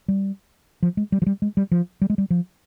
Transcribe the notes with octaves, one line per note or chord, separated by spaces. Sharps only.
G3
F3
G#3
G3
F3
G3
G#3
G3
F3
G3
G#3
G3
F3